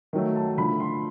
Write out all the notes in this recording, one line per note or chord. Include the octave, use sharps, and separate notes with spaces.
D#3 F#3 A3
A5
D3 F3 A3 B5
C6